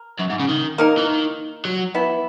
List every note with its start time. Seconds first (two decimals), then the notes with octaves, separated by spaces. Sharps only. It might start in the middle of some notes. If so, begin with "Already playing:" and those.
Already playing: A#4
0.20 F#2
0.30 G#2
0.40 C#3
0.49 D#3
0.78 A#3 D#4 A#4
0.98 E3
1.07 D#3
1.65 F#3
1.95 E3 B3 E4